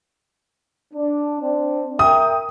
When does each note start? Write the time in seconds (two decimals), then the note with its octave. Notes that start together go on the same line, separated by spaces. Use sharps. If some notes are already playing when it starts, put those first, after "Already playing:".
0.94 D4
1.40 C4 D4
1.99 A#4 E5 G5 D#6